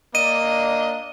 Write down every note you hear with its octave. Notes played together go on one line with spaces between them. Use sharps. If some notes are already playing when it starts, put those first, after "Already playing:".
A#3 D5 D#5 D#7
D4